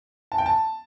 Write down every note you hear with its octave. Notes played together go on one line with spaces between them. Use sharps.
A5
G5
A5